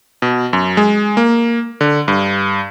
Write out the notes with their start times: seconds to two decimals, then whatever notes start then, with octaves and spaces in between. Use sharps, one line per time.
0.22 B2
0.53 F#2
0.77 G#3
1.17 A#3
1.81 D3
2.08 G2